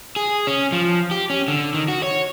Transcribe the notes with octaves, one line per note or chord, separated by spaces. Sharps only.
G#4
C#4
F3
G4
C#4
D3
D#3
F#4
C#5